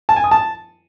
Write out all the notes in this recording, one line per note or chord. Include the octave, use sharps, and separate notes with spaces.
A5
G#5
D#6
A5